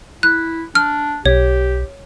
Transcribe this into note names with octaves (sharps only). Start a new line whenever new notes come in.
E4 F#6
D4 F6
B1 G4 C#5